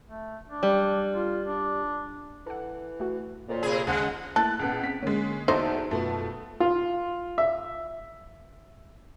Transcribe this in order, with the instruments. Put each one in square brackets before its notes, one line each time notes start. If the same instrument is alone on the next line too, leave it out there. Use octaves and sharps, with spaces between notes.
[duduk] A3
D4
[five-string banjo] G3
[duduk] F4
D4
[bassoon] E3 [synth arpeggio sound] A4 F#5
[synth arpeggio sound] A3 F#4
[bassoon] F2 [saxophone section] A#2 [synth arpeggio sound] A#3 C#5
[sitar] C3 G#4
[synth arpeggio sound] D#2 [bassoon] G#2 [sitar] C#3 [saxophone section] G#3 F#5
[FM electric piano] A3 A#3 E4 [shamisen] A4 [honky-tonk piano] F#6 A6
[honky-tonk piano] C#2 B3 [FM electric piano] A#2
[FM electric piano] C4 [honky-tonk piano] B6
[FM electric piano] D3 A#3 [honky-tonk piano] G#3 C#4
[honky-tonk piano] E2 A4 E5 [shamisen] F#3 D#4 C5
[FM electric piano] F#2 F4 B4 [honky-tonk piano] B2 A3
[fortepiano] F4
E5